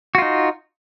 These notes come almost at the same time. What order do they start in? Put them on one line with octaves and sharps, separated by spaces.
F#4 F4 D#4